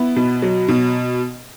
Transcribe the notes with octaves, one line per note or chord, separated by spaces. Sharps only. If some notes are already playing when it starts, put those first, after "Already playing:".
Already playing: B3 E4
B2
F#3
B2